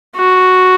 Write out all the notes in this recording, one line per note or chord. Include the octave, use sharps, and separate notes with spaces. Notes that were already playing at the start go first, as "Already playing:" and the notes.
F#4